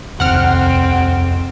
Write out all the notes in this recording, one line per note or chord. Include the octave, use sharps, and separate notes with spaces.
D#1 C2 F2 C4 F#5 F6